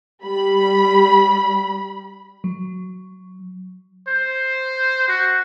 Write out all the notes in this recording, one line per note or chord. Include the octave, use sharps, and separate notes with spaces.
G3 B5
F#3
C5
F#4